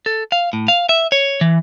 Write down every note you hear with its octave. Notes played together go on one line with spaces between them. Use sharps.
A4
F5
A2
F5
E5
C#5
E3